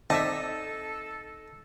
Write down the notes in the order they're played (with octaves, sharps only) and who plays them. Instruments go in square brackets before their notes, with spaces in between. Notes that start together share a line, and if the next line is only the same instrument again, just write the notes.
[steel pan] C4 D5 E5 [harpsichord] D#4 [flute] A4 [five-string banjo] A5